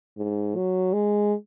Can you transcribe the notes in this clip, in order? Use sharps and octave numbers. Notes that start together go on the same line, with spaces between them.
G#2
F#3
G#3